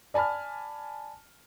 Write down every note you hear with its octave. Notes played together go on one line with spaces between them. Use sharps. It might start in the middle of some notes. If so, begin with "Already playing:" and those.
D5 G#5 A5 B5 F6